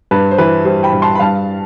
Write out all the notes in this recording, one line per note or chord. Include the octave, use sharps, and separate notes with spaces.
G2 B4
C5
E3 B4
G3 C5
G5 B5
G2
A5 C6
B5
G2 F5 A5